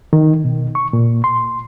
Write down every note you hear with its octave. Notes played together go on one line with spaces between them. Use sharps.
D#3
B2
C#6
A#2
C6